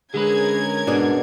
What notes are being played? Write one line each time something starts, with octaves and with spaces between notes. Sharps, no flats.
D3 G#3 C#4 G#4 A#4 B4 G#6
G#2 B2 D4 G#4